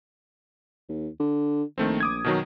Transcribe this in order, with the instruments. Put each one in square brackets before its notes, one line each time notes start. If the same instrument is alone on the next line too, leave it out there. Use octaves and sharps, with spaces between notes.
[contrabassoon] D#2
D3
[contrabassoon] A#1 [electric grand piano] D#3 A3 C4
[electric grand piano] D6 D#6 G#6
B2 D#3 F#3